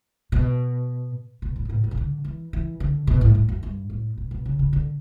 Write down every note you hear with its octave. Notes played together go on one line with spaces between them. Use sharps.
B2
B2
A2
B2
A2
G2
C#3
D3
E3
E3
D3
B2
A2
A2
F#2
G2
A2
B2
B2
C#3
C#3
D3